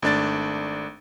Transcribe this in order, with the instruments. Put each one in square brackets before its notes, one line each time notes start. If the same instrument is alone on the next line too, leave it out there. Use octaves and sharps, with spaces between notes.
[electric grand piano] G#1 A3 D4 D5 A6